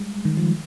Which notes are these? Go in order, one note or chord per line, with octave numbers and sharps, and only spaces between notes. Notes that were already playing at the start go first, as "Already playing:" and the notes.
Already playing: G3 G#3
D#3
F3